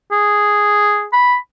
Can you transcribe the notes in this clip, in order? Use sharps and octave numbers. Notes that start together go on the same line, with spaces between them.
G#4
B5